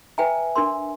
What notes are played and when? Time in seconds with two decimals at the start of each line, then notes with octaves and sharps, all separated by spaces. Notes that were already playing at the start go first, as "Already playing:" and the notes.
0.18 B4 E5 G5 G#5 A#5
0.56 D4 A#4 C6